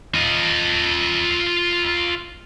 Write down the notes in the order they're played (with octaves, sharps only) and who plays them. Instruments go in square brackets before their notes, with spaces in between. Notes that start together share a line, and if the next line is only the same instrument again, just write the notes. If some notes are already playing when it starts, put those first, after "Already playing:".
[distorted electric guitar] F4 D#5